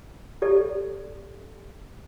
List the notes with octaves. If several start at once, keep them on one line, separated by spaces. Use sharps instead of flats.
G4 A4 D5